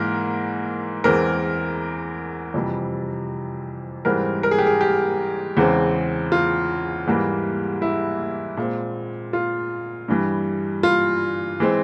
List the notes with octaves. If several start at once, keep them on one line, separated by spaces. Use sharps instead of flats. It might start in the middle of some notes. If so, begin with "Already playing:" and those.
Already playing: G#2 E3 A#3 A#4
E2 E3 G#3 C4 A#4
F2 C3 E3 G3
G#2 E3 G3 C4 A#4
A#4
G#4
G4
G#4
G4
E2 C#3 E3 G#3 C4
F4
G#2 E3 G3 A#3
E4
A#2 G#3 C4
F4
G2 E3 G3
F4
E3 G#3 C4